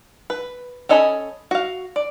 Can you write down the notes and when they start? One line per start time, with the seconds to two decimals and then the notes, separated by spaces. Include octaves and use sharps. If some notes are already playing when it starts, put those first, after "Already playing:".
0.30 B4
0.89 C#4 A4 D#5 G#5 B5
1.51 F#4 F5
1.96 D5